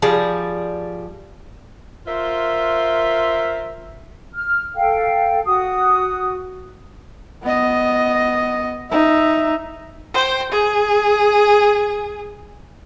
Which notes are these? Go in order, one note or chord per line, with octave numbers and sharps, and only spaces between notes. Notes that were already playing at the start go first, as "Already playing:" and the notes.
F3 G3 G#4 D5
F4 A#4 C5 E5
F6
A4 F5 G5
F#4 D#6
B3 D#5
D#4 E5
C5 G5
G#4